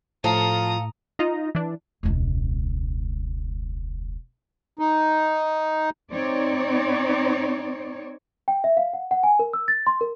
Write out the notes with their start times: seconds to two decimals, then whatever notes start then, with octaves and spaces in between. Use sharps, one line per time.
0.24 A2 F3 A4 F5 A#5 D#6
1.19 D#4 F4 D#5 A#5
1.55 E3 D4
2.03 E1 C#2
4.79 D#4
6.12 C4 D#4 C#5 D5
8.48 G5
8.64 E5
8.77 F5
8.93 F#5
9.11 F#5
9.23 G#5
9.39 A#4
9.53 E6
9.68 A6
9.87 C6
10.01 A#4